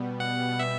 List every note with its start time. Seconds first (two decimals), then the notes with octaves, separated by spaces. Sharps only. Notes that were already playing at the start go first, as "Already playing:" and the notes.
Already playing: B2 G3 B3
0.20 B2 F#5
0.60 B3 E5